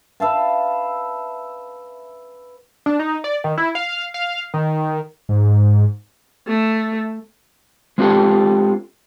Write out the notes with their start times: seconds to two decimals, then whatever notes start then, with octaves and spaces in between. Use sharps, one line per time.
0.20 B4 E5 F5 A5
2.86 D4
2.99 D#4
3.24 D5
3.44 D#3
3.58 E4
3.75 F5
4.14 F5
4.54 D#3
5.29 G#2
6.47 A3
7.98 G#3 C4 D4 F4 G4 A4